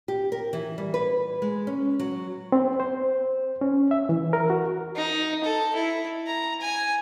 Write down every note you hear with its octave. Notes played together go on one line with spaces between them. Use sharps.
G4
A#4
E3
G3
B4
G#3
C#4
F#3
C4
C5
C#4
E5
E3
A#4
F#4
D#4
A4
E4
A#5
G#5